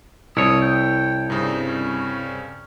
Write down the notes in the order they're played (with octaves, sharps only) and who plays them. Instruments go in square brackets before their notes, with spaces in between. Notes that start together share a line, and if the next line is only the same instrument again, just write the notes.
[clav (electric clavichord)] C2 [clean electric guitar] E4 C#5 [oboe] D#6
[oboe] G5
[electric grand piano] G2 C#3 C4 [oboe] D#4
[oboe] C#4